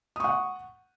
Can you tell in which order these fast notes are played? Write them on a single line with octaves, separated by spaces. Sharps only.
D#6 C#6 F#5